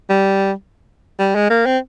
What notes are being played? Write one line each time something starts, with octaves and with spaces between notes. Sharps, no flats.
G3
G3
G#3
A#3
C4